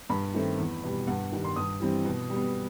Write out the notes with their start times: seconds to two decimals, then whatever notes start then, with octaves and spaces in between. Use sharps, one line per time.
0.10 G2 B5
0.34 D#3 A3 C4
0.58 E2
0.84 B2 G3
1.07 G2 F#5
1.32 D#3 G3
1.44 C6
1.56 G2 D#6
1.80 E3 G3 C4
2.05 B2
2.30 G3
2.35 B3